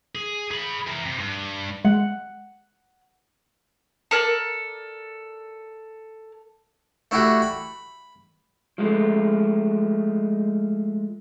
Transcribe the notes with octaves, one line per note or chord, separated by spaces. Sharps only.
G#4
G#4 B5
E3 A#4
C3
G2
G#3 F#5
A4 A#4 C5 D5
A3 D4 E4 F#4 G4 E5
B5
F3 G#3 A3